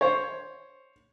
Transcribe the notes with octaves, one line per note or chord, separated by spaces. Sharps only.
C5 C#5